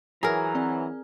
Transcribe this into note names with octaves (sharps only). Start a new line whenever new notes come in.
E3 F#3 G#4 A#4 A#5
C4 D5